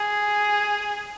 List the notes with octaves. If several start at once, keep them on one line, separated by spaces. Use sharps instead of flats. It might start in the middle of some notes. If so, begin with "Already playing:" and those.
Already playing: G#4